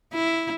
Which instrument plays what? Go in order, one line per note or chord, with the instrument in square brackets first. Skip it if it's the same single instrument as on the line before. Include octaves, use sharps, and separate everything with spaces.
[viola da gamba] E4